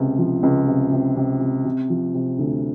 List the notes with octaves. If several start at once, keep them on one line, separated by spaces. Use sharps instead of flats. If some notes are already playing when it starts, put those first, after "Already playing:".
Already playing: C#2 C3
F3
C#2
C3
C3
C3
C3
C3
F3
C3
D2